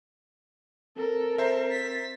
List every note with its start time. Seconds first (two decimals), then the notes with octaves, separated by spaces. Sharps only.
0.97 C4 A4 A#4
1.38 C5 E5
1.71 A6 B6